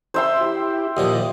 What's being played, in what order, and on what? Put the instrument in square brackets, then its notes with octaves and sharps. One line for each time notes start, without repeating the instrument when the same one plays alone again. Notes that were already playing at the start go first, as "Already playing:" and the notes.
[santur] C5 E5 C6
[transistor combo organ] E4 G4
[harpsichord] D#2 A#2 F3 [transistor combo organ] G4 D#5